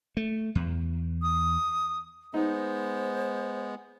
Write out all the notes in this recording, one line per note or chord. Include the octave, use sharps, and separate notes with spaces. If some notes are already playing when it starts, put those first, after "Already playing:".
A3
E2
D#6
G#3 B3 D#4 C5